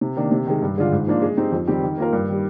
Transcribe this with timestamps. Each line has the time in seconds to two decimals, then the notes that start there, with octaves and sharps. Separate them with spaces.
0.01 C3
0.17 D#3 A#3 D4
0.32 C3
0.47 D#3 G#3
0.62 G2
0.77 D3 G#3 D4 F4
0.92 G#2
1.07 F3 A#3 D4 F4
1.22 G#3
1.37 C4 D#4 G4
1.52 F2
1.67 D#3 G3 C4 G4
1.83 D#3
1.98 A#3 F4 A#4
2.13 G2
2.29 D#3 G3